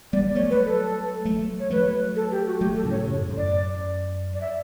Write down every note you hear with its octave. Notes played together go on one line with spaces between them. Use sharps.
G3 B3 D5
F#3 A3 C#5
B4
A4
F#3 A3
C#5
F#3 A3 B4
A4
G4
F#4
F#3 A3 G4
A4
A2 C#3
C#5
F#2 A2
F#2
D5
D5
E5